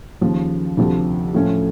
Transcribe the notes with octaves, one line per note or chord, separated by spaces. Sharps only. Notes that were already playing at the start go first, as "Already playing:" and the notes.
D#2 C#3 F3
D2 C3 F3
A2 F3 A3 C#4